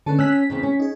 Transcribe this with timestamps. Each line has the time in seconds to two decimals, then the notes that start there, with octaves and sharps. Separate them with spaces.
0.06 D3 C#4 A4 B4 A5
0.19 C#4 E6 F#6 B6
0.33 B6
0.50 E2 C#3 C4
0.63 C#4
0.80 D#4 G#4